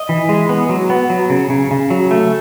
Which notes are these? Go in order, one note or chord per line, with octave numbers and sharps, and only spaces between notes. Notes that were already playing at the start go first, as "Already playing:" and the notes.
Already playing: D#5
E3
G#3
B3
F#3
B3
F#3
C#3
C#3
C#3
F#3
A3